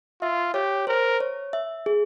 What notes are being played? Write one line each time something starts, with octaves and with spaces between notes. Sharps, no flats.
F4 E5
G4 C#5
A#4 C5
C#5
E5
G#4